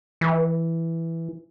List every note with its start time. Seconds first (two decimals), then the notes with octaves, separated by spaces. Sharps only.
0.21 E3